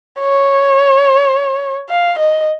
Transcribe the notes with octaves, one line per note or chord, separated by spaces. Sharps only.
C#5
F5
D#5